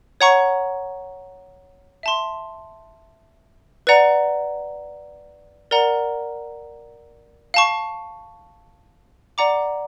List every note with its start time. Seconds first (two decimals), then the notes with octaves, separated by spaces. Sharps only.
0.21 C#5 F#5 A#5 C#6
2.03 E5 A5 C6
3.87 B4 D5 F#5 A#5
5.71 A#4 D5 F#5 A#5
7.54 F5 A5 C#6
9.38 D5 F#5 A#5 D6